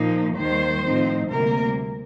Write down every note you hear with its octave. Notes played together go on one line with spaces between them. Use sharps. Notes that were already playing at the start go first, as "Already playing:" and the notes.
Already playing: A#2 F3 A#3 D#4
D#2 D#3 G3 C5
A2 F3 C4 D#4
D2 C3 G3 A#3 A#4